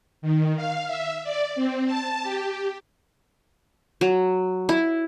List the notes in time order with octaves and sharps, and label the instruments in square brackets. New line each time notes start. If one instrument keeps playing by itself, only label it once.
[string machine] D#3
F5
E5
D5
C4
A5
G4
[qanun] F#3
E4